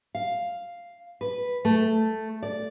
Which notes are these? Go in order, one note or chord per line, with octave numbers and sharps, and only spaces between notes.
F5
B4
A3
D5